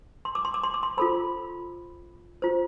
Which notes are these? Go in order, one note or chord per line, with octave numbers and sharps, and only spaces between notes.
C6
D6
C6
D6
C6
D6
C6
F4 A4 C5 B5
F4 C5